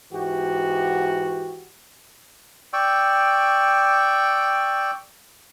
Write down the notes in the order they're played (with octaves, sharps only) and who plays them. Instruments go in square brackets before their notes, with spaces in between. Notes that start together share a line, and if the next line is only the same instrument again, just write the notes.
[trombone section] G#2 E3 F#4 G4
[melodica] D5 G5 C#6 E6